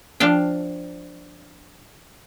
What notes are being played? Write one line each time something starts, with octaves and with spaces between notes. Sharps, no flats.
F3 D4 F5 G5